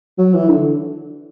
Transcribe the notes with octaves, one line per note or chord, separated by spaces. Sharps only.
F#3
E3
D3